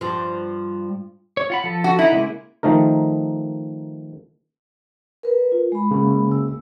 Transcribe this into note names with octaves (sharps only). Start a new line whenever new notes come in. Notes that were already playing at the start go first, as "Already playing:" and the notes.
G2 F3
C#5
F4 F#5 B5
F3 A4
F#4
D#4 E4 F#5
C#3 G#3 A#3
D#3 F3 A3 D#4 A#4
A#4 B4
F4
G#3 B5
C#3 A#3
E6